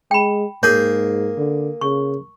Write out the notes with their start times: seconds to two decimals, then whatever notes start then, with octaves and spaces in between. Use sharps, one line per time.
0.11 G#3 G5 B5
0.63 G#2 A#3 G#4 C#5
1.38 D3
1.81 C#3 C#6